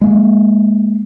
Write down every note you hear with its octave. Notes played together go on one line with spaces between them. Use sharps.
G#3 A#3